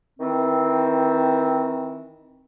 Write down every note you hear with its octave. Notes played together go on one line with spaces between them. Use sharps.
D#3 E3 C4